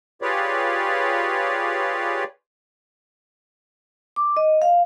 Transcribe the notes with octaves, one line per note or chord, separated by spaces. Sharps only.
F4 G4 G#4 B4 C#5 D5
D6
D#5
F5